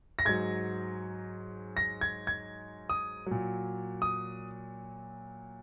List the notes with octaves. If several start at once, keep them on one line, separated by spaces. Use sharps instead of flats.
A#6
G#2 F#3 G#6
A#6
G#6
G#6
D#6
A#2 F#3
D#6